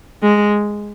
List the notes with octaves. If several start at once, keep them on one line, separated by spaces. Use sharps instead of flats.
G#3